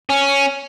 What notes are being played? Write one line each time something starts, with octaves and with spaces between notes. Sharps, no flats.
C#4